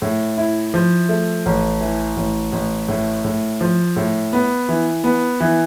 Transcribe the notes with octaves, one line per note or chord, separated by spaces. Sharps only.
A2
E4
F3
A3
A1
E3
A1
A1
A2
A2
F3
A2
B3
E3
B3
E3